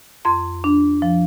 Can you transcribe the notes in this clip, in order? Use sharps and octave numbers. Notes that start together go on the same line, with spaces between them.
F2 C6
D4
F3